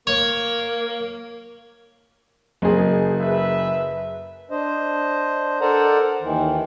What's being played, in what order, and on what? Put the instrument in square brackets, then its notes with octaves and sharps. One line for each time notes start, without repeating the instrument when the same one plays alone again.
[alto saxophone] A#3 [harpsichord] C#5
[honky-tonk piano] F#1 G#4
[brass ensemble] B4 E5
[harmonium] D4 C5 D#5
A4 A#4 C5 D5 F#5 A#5
D#2 D#3 E3